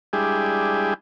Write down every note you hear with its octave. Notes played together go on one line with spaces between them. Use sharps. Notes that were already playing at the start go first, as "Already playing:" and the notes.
G3 G#3 D4 E4 G4 G#4